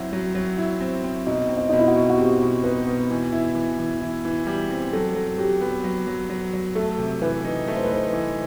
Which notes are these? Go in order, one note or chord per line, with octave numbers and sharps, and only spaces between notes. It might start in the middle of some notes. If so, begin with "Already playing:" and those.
Already playing: F#3 C4 E4 F#4
F#3
F#3
E4
C4
C4
B2 D#4
C4
D#4
B2 D#4
E4
F#4
B2
F#4
C4 G4
B2
D#4 B4
B2
E3
E4
E3
E3
E4
E3
G3
C4
F#3 A4
F#3
F#3 G4
B3
F#3
F#3
F#3
F#3
A3 A4
C3
E3 B4
D#4
A3
C5
B4
D#4 C5
E3